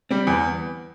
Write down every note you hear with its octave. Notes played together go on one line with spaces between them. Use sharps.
G3 C4
E2 B3